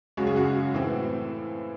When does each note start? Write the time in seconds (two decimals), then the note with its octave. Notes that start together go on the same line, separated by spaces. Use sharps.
0.17 F#2 C#3 G#3 C#4 F#4
0.27 G#4
0.36 F#4
0.74 A2 E3 C4